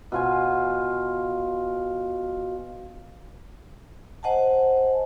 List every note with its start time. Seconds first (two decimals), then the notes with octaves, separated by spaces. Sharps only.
0.12 B2 F4 G#5
4.23 C5 D#5 F#5 G#5 A5